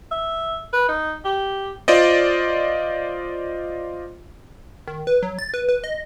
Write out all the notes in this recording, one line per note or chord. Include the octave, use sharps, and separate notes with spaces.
E5
B4
D#4
G4
F4 C5 D5 D#5
D#3
B4
F#3
A6
B4
B4
D#5